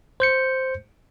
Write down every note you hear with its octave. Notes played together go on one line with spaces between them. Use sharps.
C5 G6 C#7